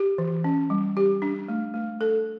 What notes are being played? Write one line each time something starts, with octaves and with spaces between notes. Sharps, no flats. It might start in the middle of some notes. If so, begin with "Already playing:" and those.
Already playing: G4
E3
C#4
G3
G4
D4
A3
A3
A4